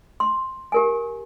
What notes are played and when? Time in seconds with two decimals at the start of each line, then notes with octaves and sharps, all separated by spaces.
0.20 C6
0.72 G4 A#4 G#5